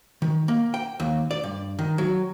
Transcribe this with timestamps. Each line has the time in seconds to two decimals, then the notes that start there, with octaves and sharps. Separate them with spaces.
0.22 D#3
0.48 A#3
0.74 G5
1.00 D#2
1.31 D5
1.44 G2
1.79 D#3
1.98 F#3